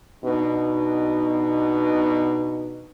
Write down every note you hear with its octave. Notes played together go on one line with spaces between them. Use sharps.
B2 B3 D4 D#4